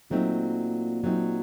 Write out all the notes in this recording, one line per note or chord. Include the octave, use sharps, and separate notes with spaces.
A#2 F#3 A3 C4 D#4
F#3 A3 C4 D#4